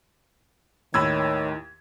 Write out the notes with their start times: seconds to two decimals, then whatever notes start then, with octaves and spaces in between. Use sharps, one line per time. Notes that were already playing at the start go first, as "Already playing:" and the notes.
0.94 D#2 A2 D#3 C#5 B5 E6 G#6